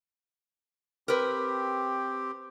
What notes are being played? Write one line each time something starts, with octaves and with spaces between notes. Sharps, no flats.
C4 G4 A#4 B4